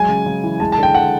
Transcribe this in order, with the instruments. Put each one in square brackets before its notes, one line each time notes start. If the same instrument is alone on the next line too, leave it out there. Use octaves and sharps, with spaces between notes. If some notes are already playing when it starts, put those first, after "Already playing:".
Already playing: [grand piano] F#3 G#3 G#5
C#3
C#3
E3
G#3 A5
A5
D3 G5
D3 F#5